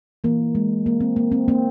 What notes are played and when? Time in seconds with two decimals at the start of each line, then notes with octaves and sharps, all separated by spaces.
0.24 E3 A#3
0.55 G#3
0.86 A#3
1.01 C4
1.16 A#3
1.32 C4
1.48 A#3 C4